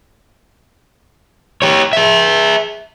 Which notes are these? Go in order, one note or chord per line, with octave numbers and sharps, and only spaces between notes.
G4 C#5
G#4 E5